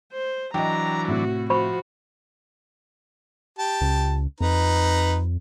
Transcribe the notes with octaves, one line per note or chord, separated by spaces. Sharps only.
C5
E3 F#3 D4 D#5 G5 A#5
A2 C3 F#4
F3 F#4 C5 B5 C#6
G4 A5
C#2
F2 D#4 B4 A#5